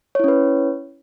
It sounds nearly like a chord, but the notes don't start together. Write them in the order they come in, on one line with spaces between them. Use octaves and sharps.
C#5 E4 C#4 B4